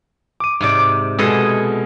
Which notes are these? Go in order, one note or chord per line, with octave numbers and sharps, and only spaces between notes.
D6 D#7
G#2 C3 D5
B2 G#3 B3 G#4 A4 D#5